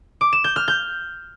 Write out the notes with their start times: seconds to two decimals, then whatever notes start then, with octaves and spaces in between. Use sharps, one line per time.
0.21 D6
0.33 E7
0.44 G6
0.56 F6
0.68 G6